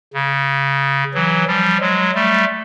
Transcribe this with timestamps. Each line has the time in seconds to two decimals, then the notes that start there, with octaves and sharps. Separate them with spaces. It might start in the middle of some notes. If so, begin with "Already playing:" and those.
0.14 C#3
1.14 E3 F#3
1.47 F3 G3
1.81 F#3 G#3
2.15 G3 A3